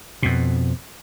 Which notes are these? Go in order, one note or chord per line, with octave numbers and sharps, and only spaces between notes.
F2 B2